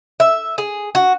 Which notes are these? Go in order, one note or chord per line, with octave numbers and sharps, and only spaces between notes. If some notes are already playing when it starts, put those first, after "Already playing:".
E5
G#4
F#4